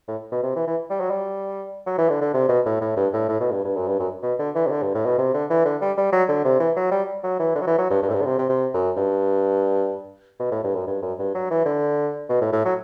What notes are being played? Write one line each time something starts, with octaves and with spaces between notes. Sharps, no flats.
A2
B2
C3
E3
E3
G3
F#3
G3
F#3
E3
D3
D3
C3
B2
A2
A2
G2
A2
A2
B2
G2
G2
F#2
G2
F#2
B2
D3
E3
C3
D3
G2
A2
B2
C3
D3
E3
D3
G3
G3
F#3
D3
C3
E3
F#3
G3
F#3
E3
D3
F#3
E3
F#3
G2
G2
A2
G2
D3
C3
C3
C3
F#2
G2
B2
A2
G2
F#2
G2
F#2
G2
F#3
E3
D3
B2
A2
A2
F#3